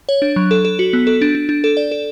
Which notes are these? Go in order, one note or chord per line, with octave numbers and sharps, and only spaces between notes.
C#5
D4
F#3
A4
A4
F#4
B3
A4
D4
D4
D4
A4
D5
A4